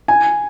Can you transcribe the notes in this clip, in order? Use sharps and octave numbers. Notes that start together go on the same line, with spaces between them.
G#5